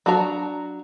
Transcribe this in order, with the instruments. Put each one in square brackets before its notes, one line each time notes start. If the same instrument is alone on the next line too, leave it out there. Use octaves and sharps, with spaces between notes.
[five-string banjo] F#3 D4 F#4 A#5